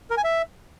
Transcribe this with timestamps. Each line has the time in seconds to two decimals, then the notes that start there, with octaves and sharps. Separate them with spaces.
0.10 A#4
0.17 G#5
0.24 E5